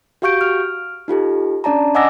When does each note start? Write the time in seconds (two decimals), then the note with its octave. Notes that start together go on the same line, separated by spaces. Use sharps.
0.22 F#4 G4 F5 C#6 G6 D7
0.41 F6
1.08 D#4 F4 G4 A4
1.64 C#4 D4 D5 A5 A#5
1.95 D#5 F#5 G#5 D6 E6 A#6